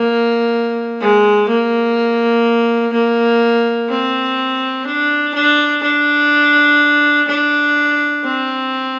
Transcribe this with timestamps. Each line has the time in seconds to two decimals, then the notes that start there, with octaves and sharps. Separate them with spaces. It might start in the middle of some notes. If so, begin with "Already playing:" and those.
Already playing: A#3
1.00 G#3
1.49 A#3
2.93 A#3
3.89 C4
4.86 D4
5.34 D4
5.83 D4
7.28 D4
8.24 C4